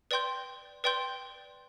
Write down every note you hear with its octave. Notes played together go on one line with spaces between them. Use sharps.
B4 D5 G5 C6 G6
B4 D5 G5 C6 G6